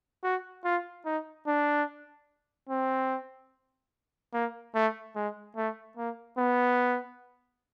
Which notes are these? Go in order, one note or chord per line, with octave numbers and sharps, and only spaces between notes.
F#4
F4
D#4
D4
C4
A#3
A3
G#3
A3
A#3
B3